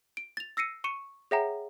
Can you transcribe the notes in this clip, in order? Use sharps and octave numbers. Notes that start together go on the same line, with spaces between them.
D7
A6 F7
E6 A#6 C7 C#7 D#7
C#6 C#7 D#7 E7
G#4 C#5 E5 F#5 G5 A#5